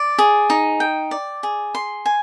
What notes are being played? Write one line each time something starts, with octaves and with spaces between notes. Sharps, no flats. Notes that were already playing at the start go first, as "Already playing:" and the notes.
Already playing: D5
G#4
D#4
G5
D5
G#4
C6
G#5